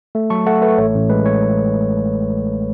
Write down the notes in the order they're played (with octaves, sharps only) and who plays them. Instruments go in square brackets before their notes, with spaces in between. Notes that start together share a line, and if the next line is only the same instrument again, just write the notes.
[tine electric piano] A3
F#3 A5 C#6
A3 F#5 A5
A3 B4
A1 C#5
A1
G#3 B4
C#5